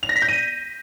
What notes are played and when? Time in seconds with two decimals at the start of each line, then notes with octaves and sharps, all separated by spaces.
0.03 F7
0.09 A#6
0.16 B6
0.22 G6
0.28 D#7